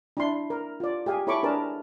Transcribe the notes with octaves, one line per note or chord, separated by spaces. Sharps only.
D4 E4 C6
A#4
F4 D5
G4 G#4 F5 G#5
E4 A4 C#5 B5 C#6 D6
D4 G#4 A#4 B4 A5